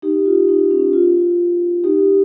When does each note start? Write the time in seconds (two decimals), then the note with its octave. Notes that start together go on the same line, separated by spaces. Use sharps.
0.02 D#4 G4
0.26 F4
0.48 D#4
0.71 C#4
0.93 F4
1.84 D#4 G4